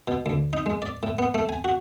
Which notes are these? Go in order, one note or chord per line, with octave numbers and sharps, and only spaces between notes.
B2
D2
D#4
G#3
D5
A2
B3
A3
G#5
F#4